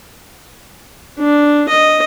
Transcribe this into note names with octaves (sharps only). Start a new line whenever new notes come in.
D4
D#5